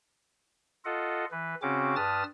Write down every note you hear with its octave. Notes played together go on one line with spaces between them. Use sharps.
F4 A4 D#5 F#5
E3 B4
C#3 C4 C#4 F#4 D6
G2 B4 A5 D#6 F6 A6